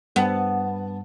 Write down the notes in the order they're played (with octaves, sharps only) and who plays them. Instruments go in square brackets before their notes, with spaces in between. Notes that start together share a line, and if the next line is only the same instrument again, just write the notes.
[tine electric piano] G2 G3 A5 [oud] B3